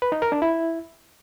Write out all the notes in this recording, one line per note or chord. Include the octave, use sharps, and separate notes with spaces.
B4
D#4
A#4
D4
E4